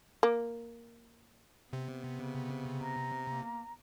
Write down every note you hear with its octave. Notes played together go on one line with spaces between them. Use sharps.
A#3
C3 B3
C#3
A#5
A#3